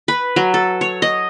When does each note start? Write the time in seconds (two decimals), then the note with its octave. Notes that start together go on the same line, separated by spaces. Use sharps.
0.08 B4
0.36 F#3
0.54 A4
0.81 C#5
1.02 D#5